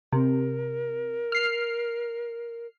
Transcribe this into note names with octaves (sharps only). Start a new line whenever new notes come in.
C3 A#4
F6 C7